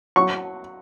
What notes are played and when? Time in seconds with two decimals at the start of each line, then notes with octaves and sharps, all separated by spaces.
0.16 F#3 C#6